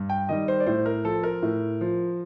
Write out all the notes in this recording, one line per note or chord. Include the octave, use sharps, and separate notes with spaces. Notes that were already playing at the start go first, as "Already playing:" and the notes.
Already playing: G2
G5
D#3 G3 D#5
C5
D5
A2 C5
A#4
F3 A4
A#4
A2
F3